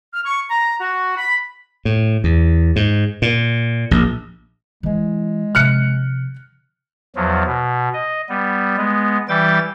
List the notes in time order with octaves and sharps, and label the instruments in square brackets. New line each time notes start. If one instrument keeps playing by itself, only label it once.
[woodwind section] F6
C#6
A#5
F#4
B5
[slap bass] A2
E2
G#2
A#2
A#1
[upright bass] E3 E4 [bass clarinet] G#3
[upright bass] C3 F3 [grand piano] F6 F#6 C#7
[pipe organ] E2 F3 F#3
B2
D#5
G3 B3
G#3 B3
E3 G3 G5 A6